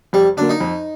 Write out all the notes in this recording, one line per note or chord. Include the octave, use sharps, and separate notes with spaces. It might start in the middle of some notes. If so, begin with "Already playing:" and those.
F2 G3
D3 F#3 A#3 D4
D#4
F2